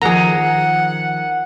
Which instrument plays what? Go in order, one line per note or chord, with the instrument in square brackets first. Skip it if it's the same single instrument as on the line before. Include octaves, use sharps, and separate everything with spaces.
[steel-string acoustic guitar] D#3 F3 A#4 [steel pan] G#4 A#5 [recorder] F#5